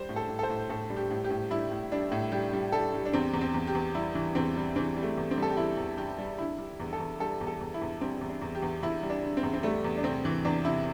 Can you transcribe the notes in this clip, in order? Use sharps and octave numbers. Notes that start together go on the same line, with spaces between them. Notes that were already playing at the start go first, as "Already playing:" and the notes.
Already playing: G3 C5
A2
A4
A2
A4
C5
A2
A2 A4
G3
G4
A2
G4
A2
G3 E4
A2
G3 D4
A2
G3 G4
G3
G3 A4
G3
D4
E2 C4
E2
C4
E2
G4
E2
G3 E4
E3
E2 C4
G3
E3 C4
G3
A3
E2
C4
G3 A4
G4
E2 E4
E2
G3 G4
G3
D3 E4
G3
E2
A4
E2
G3 A4
E2
A4
E2
E4
E2
G3 C4
E2
D4
E2
G4
E2
E2 E4
G3
D4
D3
C4
E2
C4
G3 A3
E2
D4
C3 C4
E3
E2 D4
C3 E4